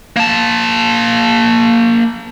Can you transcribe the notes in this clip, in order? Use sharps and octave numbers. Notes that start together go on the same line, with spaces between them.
A#3 A5